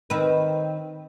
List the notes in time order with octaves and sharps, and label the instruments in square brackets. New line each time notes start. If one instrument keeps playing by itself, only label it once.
[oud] D#3 C4 B4